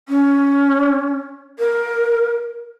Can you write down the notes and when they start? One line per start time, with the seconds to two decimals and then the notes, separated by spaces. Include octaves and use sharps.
0.09 C#4
1.59 A#4